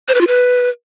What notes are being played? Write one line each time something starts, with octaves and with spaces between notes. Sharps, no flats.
C5
B4
F4
B4